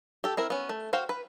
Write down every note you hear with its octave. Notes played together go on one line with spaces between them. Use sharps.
G4 A4
C4 E4 A#4
B3 C#4
A3
F#4 C5 F5 G5
B4